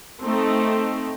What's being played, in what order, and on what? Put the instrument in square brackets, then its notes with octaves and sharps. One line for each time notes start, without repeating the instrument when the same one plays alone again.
[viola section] A3 C4 D#4 A4